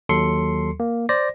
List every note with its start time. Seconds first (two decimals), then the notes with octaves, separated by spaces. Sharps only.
0.09 D#2 F#3 A4 C6 C7 C#7
0.80 A#3
1.09 C5 D5 A#6